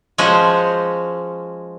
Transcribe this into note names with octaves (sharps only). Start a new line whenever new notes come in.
F3 G#3 C#4 F#4 C5 C#5